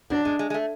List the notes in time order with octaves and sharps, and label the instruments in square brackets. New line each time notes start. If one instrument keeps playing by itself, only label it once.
[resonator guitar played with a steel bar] F#3 [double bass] D4
[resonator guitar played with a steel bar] G#3
G#3
G#3
A3